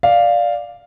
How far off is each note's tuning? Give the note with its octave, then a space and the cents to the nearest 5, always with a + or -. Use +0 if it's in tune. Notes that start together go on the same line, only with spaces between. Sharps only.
D5 +0 F5 +0